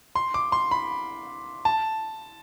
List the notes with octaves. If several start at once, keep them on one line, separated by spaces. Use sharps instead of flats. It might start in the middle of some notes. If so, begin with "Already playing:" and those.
C6
D6
C6
B5
A5